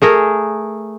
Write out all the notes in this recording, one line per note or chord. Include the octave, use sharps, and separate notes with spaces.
A3 G#4 A#4